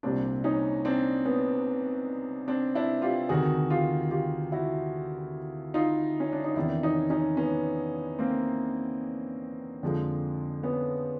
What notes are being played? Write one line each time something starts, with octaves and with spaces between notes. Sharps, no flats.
C2 A#2 G3 C4 D4
C#4 D#4
C4 D4
B3 C#4
C4 D4
D4 E4
F4 G4
D2 C3 D#3 F#4 G#4
F4 G4
F4 G4
E4 F#4
D#4 F4
C#4
D4
D#4
E2 C3 D#3 D4 E4
C#4 D#4
C#4 D#4
B3 C#4
A#3 C4
F2 D3 F3 G#3
B3 C#4